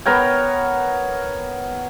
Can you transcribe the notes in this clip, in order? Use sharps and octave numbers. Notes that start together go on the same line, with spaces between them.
B3 A#4 C#5 G5